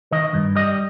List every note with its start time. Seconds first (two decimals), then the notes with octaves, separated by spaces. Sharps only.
0.12 D#3 D#5
0.34 G2
0.56 G3 D#5